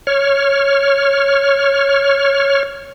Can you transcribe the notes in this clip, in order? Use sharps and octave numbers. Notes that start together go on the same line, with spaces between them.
C#5 F6